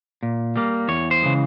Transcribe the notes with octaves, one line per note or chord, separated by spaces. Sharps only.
A#2
G3 A#3
E2 C#5
C5
C#3 E3 G#3